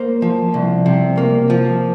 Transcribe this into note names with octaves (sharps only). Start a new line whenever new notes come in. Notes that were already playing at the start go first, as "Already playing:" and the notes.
Already playing: A#3 C5
F3
C2
C3
A#3
F3